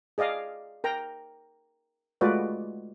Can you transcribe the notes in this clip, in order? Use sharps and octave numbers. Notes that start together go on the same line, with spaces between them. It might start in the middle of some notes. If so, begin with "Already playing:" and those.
G#4 D5 D#5 F5
A#4 G5 A#5
G#3 A3 F4 F#4 B4 D5